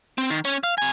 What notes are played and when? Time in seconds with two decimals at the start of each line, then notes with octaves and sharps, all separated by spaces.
0.18 C4
0.30 D#3
0.45 C#4
0.64 F5
0.78 C3 G#5